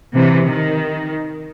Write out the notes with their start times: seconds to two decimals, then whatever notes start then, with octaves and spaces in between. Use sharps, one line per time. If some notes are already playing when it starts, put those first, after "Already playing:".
0.15 C3 E3
0.46 D#3